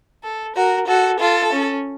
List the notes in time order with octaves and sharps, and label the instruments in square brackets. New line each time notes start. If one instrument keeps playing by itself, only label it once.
[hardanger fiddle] A4
[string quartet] F#4 [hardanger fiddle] A#4
[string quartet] F#4 [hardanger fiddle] A4
[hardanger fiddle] F4 [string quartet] A4
[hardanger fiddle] C#4